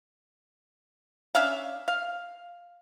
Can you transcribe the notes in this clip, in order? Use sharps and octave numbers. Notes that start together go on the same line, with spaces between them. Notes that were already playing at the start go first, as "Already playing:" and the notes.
C#4 D4 E5 F5
F5